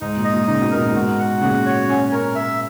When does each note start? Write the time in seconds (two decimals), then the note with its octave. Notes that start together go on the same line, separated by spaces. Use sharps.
0.01 G#2 D#4
0.17 A#2
0.24 D#5
0.33 A#2
0.48 C#3 D#4
0.61 B2
0.71 A#2 A#4
0.86 G#2 B2
0.95 F#4
1.19 F#5
1.41 A#2 C#3 F#4
1.66 C#5
1.89 C#4
2.12 A#4
2.35 E5